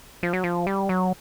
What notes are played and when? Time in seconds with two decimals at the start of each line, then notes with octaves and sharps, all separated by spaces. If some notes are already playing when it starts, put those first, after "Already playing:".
0.23 F3
0.33 F#3
0.44 F3
0.67 G3
0.89 F#3